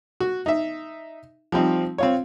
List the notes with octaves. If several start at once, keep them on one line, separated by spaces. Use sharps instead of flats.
F#4
D#4 E5
F3 G3 C4 D#4
C4 F4 C#5